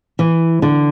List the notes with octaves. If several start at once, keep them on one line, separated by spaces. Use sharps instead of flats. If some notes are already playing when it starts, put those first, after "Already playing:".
E3
D3